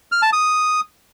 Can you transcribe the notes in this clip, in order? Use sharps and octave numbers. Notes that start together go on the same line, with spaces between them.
F6
A5
D#6